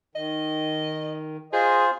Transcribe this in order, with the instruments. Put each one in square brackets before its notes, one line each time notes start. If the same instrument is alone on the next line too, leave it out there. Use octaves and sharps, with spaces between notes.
[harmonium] D#3 [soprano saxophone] D#5
[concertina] F4 C5 [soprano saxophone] G#4 [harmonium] D#5